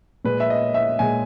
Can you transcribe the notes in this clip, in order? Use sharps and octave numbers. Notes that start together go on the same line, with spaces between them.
A#2 G#3 B4
E5
D#5
E5
A#2 G#3 G#5